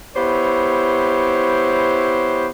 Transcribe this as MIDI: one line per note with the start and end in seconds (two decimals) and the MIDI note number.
0.16 2.48 59
0.16 2.48 64
0.16 2.48 67
0.16 2.48 72
0.16 2.48 73